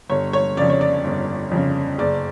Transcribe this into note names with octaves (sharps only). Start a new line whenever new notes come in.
G1 C#5
C#5
F2 C#3 D5
C#5
D5
G1
F2 C#3
F#1 D5